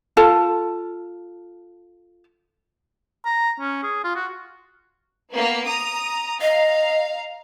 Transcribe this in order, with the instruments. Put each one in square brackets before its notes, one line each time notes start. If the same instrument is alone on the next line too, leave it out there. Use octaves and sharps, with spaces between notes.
[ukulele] F4 A4 A5
[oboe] A#5
C#4
G#4
F4
F#4
[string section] A#3 B3
A#5 D#6
[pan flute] D#5 [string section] F5 A#5